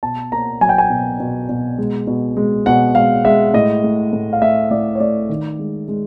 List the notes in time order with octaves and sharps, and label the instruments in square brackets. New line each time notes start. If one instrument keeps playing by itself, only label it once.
[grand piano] B2 A5
A#3 A#5
F#3 G#5
G5
G#5
B2
B2
B2
G#3
B2
G#3
B2 F#5
G#3 F5
G#3 E5
A2 D#5
A3
A2
F5
A3 E5
A2 D5
C#5
A3 D5
D#3
G#3
G#3